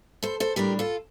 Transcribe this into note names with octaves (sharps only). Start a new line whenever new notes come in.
A4 C5
A4 C5
A2 G3 D4 G4 A#4
F4 A4